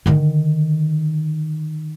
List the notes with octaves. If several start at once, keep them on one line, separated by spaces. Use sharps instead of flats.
D3 D#3